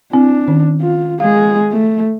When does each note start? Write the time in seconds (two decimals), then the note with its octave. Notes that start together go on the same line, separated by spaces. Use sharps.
0.13 C4 D4 E4
0.48 D#3 C#4
0.81 F4
1.20 G#3 G#4 F5
1.72 A3